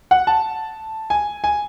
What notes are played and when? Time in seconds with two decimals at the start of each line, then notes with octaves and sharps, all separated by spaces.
0.11 F#5
0.27 A5
1.10 G#5
1.44 G#5